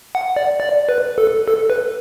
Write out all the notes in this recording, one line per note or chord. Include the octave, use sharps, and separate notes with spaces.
F#5
D5
D5
B4
A4
A4
B4